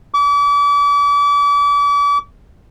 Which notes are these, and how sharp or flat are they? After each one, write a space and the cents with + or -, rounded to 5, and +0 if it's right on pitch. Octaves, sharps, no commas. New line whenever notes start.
D6 -35